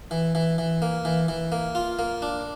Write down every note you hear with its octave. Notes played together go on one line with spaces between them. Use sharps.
E3
E3
E3
A#3
E3
E3
A#3
F4
A#3
D4